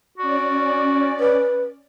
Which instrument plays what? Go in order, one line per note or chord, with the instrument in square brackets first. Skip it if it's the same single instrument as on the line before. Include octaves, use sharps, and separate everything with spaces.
[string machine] C#4 D5 [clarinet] F#4
[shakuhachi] B4